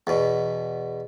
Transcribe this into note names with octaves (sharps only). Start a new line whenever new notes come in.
E2 B2